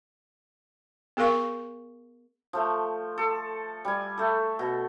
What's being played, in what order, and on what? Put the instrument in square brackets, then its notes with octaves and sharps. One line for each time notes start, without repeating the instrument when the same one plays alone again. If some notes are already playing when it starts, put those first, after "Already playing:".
[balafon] B3 G#4 A#4 F5 C#6
[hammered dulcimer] F3 A3
A4
G3 G#5
A3 A4
B2